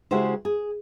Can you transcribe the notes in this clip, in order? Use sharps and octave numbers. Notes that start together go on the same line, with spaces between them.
C#3 G#3 E4 F#4 G4 C5
G#4